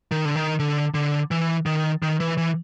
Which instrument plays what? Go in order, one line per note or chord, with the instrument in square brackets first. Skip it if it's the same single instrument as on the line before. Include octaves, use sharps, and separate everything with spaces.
[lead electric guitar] D#3
D3
D#3
D3
D3
E3
D#3
D#3
E3
E3